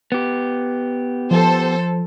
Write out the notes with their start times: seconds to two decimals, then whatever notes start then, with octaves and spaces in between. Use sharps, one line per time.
0.12 B3 G4
1.31 F3 A4 C5